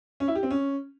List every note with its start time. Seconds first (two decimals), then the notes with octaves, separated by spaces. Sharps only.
0.20 C#4
0.28 E4
0.35 G4
0.43 C4
0.51 C#4